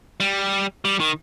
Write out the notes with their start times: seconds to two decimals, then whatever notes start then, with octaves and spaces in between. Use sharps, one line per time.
0.20 G3
0.85 G3
1.00 D#3